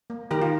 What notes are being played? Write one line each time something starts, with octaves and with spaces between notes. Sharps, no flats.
A#3
D#3 G4 A#4
F4